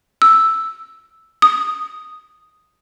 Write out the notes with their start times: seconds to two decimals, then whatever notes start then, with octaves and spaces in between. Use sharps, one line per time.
0.22 E6
1.42 D#6